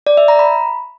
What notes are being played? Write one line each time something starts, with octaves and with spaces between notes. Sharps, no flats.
D5
E5
A#5
B5